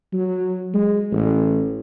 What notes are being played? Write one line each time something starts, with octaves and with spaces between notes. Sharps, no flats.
F#3
G#3
A1